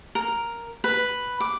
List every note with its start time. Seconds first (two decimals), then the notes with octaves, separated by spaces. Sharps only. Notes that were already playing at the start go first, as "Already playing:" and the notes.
0.15 A#4
0.84 B4
1.40 D6